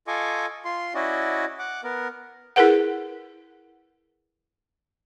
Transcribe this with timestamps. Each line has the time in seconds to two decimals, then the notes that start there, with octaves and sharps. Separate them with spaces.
0.07 F4 A4 D#5 G#5 C#6 D6
0.65 F4 C6
0.95 C#4 E4 F#4 D5 D#5
1.59 F#5 D6
1.84 B3 A#4
2.56 E4 G#4 A#4 B4 F#5